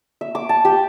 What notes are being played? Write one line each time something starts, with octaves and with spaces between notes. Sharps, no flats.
E5
D6
A5
G4